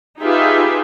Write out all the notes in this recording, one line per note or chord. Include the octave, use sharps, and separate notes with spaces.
D#4 F4 G4 G#4 B4 E5